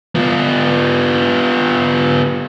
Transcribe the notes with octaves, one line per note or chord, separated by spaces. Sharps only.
B3 F4